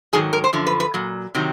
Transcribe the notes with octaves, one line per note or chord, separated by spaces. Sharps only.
G#2 D#3 F#3 G#4
A#4
C5
F#2 D3 F3
B4
B4
A#2 F#3
C3 D#3 F#3